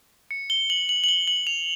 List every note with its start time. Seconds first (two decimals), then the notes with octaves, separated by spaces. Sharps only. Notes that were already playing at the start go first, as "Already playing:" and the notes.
0.31 C#7
0.50 G7
0.70 F#7
0.89 F#7
1.04 F#7
1.09 G7
1.28 F#7
1.47 F7